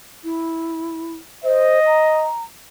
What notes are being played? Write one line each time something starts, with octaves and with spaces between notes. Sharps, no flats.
E4
C5 D#5
A#5